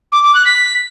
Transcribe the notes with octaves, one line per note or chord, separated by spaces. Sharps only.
D6
D6
F#6
B6